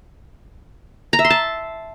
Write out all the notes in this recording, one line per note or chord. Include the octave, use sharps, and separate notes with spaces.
A#5
E5
C6
A5